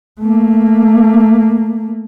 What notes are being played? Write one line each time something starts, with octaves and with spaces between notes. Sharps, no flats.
A3 A#3